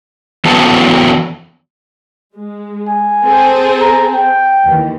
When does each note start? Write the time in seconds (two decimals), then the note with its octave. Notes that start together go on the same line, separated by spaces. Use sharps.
0.45 E3 F#3 B3 A4 A5
2.36 G#3
2.88 G#5
3.24 C4 G#4 A4
3.81 A#5
4.13 G5
4.65 D#2 E3